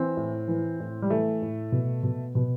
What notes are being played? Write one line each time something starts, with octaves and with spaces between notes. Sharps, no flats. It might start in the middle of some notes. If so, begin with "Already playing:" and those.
Already playing: E3 C4
A2
E3
A2
G3
E3 A3
A2
B2
B2
B2